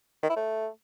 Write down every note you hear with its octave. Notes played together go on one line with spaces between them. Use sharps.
D#3
E4
A3